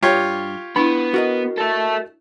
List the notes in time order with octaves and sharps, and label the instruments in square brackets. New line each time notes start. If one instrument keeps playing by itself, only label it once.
[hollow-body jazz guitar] G2 [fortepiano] F4 G4 C#5
[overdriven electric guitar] B3 [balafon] D4 E4 [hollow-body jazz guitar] B5
[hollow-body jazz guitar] F#4 A#4 D#5
[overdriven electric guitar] A4 E5